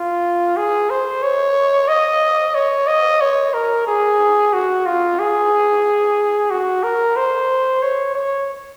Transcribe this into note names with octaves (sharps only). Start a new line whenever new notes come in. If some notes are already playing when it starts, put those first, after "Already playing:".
Already playing: F4
G#4
C5
C#5
D#5
C#5
D#5
C#5
A#4
G#4
F#4
F4
G#4
F#4
A#4
C5
C#5
C#5